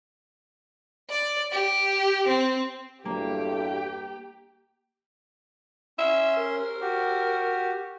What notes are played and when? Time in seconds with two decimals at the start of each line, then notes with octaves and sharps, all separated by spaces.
1.10 D5
1.51 G4
2.27 C4
3.05 E2 G2 A#3 F#4 G4 A4 G5
5.99 C#4 E5 C6
6.37 A#4
6.81 F#4 G4